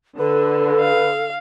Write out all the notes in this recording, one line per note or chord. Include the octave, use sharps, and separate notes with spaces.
D3 A4 B4
F5